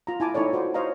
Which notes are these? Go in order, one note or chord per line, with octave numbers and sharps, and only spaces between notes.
F4 A#5
E4 G#5 A5 D6
D#4 E4 A4 C#5 D5
F4 F#4 C5 D5
C5 C#5 D#5 F5 A#5